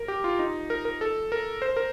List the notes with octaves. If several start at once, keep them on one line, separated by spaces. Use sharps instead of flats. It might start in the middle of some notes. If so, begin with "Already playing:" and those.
Already playing: A#4
G4
F4
D#4
A#4
A#4
A4
A#4
C5
A#4